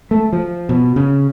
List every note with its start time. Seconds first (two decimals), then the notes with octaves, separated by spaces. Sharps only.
0.11 A3
0.33 F3
0.69 B2
0.96 C#3